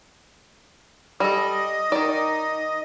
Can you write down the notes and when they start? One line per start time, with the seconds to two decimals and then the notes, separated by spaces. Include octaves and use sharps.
1.20 G3 A4 D#5
1.92 D#3 D#4 D5